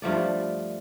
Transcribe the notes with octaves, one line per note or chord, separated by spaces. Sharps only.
G2 F3 A3 D5